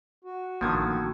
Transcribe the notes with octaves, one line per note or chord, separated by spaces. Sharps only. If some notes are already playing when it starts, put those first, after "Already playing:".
F#4
A1 D3 D#3 F3 A#3 G#6